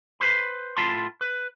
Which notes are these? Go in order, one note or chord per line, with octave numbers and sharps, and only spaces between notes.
B4 C5 B5
A2 F4 A5 B5 C6
B4